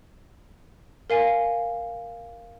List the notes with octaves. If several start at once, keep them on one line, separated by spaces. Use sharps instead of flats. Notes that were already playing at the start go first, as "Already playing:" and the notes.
A#4 F5 G#5